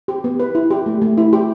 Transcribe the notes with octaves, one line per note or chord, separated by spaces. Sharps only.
G4
B3
B4
E4
G4
A3
A3
E4
G4